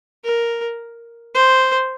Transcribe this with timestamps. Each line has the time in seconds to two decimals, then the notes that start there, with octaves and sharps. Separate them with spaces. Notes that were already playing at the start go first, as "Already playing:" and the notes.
0.24 A#4
1.35 C5